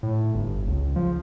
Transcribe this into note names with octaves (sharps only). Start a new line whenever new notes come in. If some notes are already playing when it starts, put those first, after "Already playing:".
A2
G1
C#2
F3